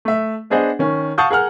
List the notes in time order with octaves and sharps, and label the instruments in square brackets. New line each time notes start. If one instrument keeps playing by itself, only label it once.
[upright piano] A3 E5
B3 D4 G#4 C5 D#5 F#5
D#3 C#4
F5 F#5 A5 C#6 D#6 G6
G#4 A#4 F#5 F6